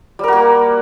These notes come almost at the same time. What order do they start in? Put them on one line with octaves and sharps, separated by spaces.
G3 A#4 F#4 A#3